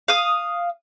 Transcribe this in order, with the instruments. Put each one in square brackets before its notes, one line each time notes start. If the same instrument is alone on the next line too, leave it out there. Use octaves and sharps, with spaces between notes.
[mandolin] F5 D#6